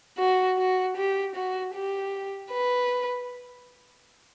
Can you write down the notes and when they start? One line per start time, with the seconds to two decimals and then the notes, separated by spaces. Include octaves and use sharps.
0.18 F#4
0.58 F#4
0.96 G4
1.35 F#4
1.74 G4
2.51 B4